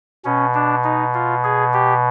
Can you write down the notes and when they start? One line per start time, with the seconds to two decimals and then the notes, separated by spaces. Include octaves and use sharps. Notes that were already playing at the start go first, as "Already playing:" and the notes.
0.25 B2 C#4
0.54 D4
0.84 D#4
1.14 F4
1.44 G#4
1.73 G4